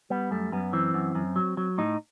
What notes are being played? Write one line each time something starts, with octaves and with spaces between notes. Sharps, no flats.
G3 B3
F#2 A3
F#2 B3
E3 C4
F#2
F#2
F#3
F#3
A2 D#4